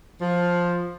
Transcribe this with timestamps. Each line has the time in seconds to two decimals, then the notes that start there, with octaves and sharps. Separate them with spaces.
0.20 F3